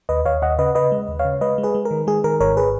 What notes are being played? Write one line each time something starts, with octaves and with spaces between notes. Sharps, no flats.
D#2 B4 D#5
D#2 C#5 F5
D#2 D#5 F#5
C#3 B4 D#5
C#3 B4 D#5
G#3
D#2
C#5 F5
C#3
G#3 B4 D#5
G#3
G#4 B4
G#3
A#4
D#3
G#3 G#4
D#3 A#4
G#1 A#4 C#5
G#4 B4